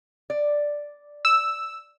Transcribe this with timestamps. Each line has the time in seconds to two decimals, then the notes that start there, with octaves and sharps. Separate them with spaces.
0.30 D5
1.25 E6